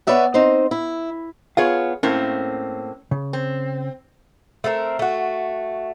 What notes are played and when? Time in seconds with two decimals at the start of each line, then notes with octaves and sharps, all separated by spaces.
0.07 B3 B4 C#5 D5 E5 F#5
0.34 C4 D#4 C5
0.71 E4
1.57 B3 F4 G#4 C#5 F5
2.03 A2 A#3 C4 C#4
3.11 C#3
3.33 C4
4.64 A3 C4 G#4 A#4
4.99 A3 F#4